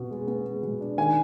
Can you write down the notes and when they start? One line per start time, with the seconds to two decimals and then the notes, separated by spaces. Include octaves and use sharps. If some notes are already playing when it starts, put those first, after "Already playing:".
Already playing: B2 B3
0.10 G#3
0.28 B3
0.46 G#3
0.63 B2
0.81 D4
0.98 D#3 G#5